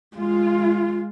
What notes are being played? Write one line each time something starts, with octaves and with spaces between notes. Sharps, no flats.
G#3 F4